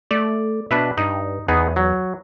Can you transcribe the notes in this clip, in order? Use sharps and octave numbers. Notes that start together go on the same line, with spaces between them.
A3 D5
B2 D4 B4 E5
G2 D#4
E2 B3 D#4 G#4
F#3